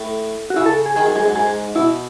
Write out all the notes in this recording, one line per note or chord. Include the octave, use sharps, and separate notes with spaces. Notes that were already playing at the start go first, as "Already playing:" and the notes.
Already playing: A2
F#4
C#3 E4
A4
G#4
D#3 G#4
F#2
G#2 G#4
F#2
G#2 G#4
B2 E4